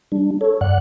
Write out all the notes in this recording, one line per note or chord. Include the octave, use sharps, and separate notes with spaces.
G3 D4
A4 C#5
G2 D5 F#5 F#6